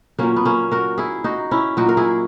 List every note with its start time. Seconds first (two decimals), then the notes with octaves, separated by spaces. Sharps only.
0.19 A#2 F#3 A#3 C#4
0.36 B3
0.45 A#3 C#4
0.72 F#4 A#4
0.98 E4 G#4
1.24 D#4 F#4
1.51 C#4 E4
1.77 A#2 F#3 D#4 F#4
1.89 A#4
1.97 E4 G#4